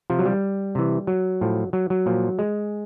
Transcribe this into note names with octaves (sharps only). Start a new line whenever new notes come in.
C3 F3
F#3
G3
C3 E3
F#3
A2 F3
F#3
F#3
A#2 F3
G#3